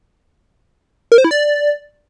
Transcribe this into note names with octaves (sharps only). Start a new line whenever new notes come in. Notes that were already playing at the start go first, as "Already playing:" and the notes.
A#4
C5
E4
D5